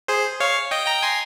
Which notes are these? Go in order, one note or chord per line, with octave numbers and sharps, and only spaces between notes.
G#4 C5
C#5 F5
D#5 G5
G5 A#5
G#5 C6